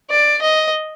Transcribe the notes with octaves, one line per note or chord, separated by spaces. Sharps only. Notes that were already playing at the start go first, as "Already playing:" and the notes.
D5
D#5